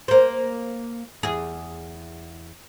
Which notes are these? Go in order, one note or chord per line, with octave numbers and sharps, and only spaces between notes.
A#3 C5
E2 G#4